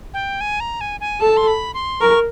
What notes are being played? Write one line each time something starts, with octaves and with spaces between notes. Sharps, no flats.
G5
G#5
A#5
G#5
G#5
A4 A5
C6
B5
C6
A#4 C#6